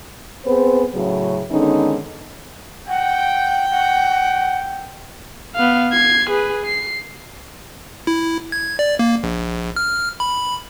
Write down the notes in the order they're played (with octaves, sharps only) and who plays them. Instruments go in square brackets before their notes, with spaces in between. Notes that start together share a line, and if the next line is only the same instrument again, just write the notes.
[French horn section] B3 C4 G#4 B4 C5
A2 C#3 F#3
D3 D#3 G#3 B3 C#4 D#4
[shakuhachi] F#5 [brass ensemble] G5
[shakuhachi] F#5
[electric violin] B3 F5
G#6 C7
G#4 B4
C7
[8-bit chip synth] E4
G#6
D5
A#3
A#1
F6
B5